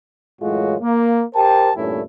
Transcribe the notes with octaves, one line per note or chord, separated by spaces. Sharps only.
F#2 A2 E3 G#3 F4 F#4
A#3
G4 A#4 C5 G5 A5
E2 G2 A#2 A3 C#4 E4